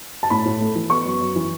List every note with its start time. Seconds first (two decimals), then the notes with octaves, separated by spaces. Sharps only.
0.23 A5
0.30 A2 B5
0.45 A2
0.61 A3
0.75 E3
0.90 B3 C#6
1.05 F#2
1.20 F#2
1.36 E3